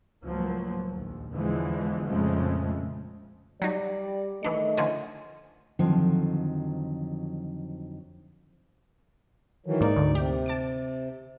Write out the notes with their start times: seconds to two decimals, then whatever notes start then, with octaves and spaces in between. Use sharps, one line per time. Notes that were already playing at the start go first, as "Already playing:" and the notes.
0.24 C#2 A2 F3 F#3 A#3
0.89 A#1 D#2
1.31 E2 D3 E3 F3 G#3
2.06 F2 A#2 C#3 F3 G#3 A3
3.62 F#3 G3 D#4 D5
4.43 D#3 E3 A3 D4 D#5 C#7
4.77 D3 F3 C#4
5.79 F2 D3 D#3 F3 F#3
9.66 D#3 E3 F#3
9.81 G#2 A#3 D#4 D5
9.96 D2
10.15 C3 G4
10.46 A5 D6 D7